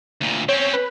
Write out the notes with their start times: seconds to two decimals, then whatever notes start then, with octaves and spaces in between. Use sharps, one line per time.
0.21 D2 A#2
0.49 C4 C#4 C#5
0.73 B4